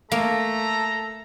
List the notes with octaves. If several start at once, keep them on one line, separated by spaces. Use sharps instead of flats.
A3 A#3 A4 A#5